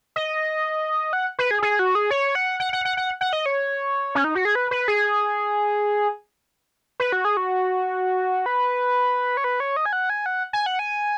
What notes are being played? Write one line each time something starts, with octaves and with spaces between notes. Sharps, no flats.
D#5
F#5
B4
G#4
G#4
F#4
G#4
C#5
F#5
F#5
F#5
F#5
F#5
F#5
D#5
C#5
C#4
D#4
F#4
G#4
B4
B4
G#4
B4
F#4
G#4
F#4
B4
C#5
B4
C#5
D#5
G#5
F#5
G#5
F#5
G#5
F#5
G#5